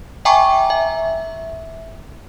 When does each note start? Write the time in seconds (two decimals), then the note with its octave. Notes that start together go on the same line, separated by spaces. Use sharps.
0.25 E5 G5 G#5 A#5 C#6 D6
0.70 E5